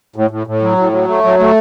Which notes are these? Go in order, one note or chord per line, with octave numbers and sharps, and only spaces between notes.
A2
A2
A2
F#3
A2
F#3
A3
F#3
A3